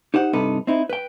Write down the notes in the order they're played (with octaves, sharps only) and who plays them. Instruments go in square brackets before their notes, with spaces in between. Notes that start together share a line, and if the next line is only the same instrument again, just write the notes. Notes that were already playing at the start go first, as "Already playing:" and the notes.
[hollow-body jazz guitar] D#4 G4 C5 F#5
G2 C3 D#4 A4 B4
C4 D#4 E4
B4 G5